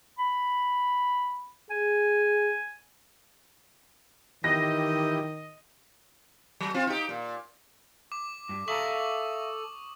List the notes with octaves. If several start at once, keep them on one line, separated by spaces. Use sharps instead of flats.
B5
G#4 G#5
D#3 E3 G4 D#5 A#6
F#3
C4 F4
D#4 G4
A#2
D6
G2
A4 E5 F5 A#5 C#6 D#6 F#7